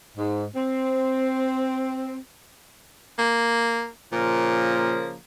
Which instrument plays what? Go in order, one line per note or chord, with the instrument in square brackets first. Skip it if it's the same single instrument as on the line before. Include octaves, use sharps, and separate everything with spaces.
[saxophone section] G#2
C4
[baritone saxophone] A#3
[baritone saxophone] A#2 [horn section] C#3 F3 A#3